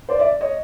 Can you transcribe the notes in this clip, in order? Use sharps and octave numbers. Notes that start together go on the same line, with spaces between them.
C5 D5
D5 E5
C#5 D#5